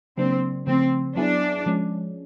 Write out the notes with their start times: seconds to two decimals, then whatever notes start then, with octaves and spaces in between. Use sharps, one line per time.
0.18 C#3 F#3 A#3 C4 D4
0.67 C#3 F3 A3 C4
1.16 F#3 B3 D4 E4 G#4
1.66 F3 G#3 C#4